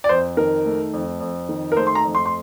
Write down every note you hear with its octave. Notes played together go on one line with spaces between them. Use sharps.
D5
F2 C5
D#3 A#4
A3
F2
F2
D#3
A#4
A3 C5
C6
A#5
F2
C6
C6